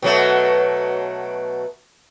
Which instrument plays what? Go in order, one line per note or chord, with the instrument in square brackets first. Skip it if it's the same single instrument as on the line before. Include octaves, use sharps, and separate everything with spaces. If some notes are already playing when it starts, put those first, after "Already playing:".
[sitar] B2 F#3 A3